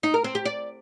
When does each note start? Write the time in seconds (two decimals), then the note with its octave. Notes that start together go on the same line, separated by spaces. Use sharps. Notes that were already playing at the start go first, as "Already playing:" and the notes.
0.03 D#4
0.14 A#4
0.24 C4
0.35 G4
0.45 D5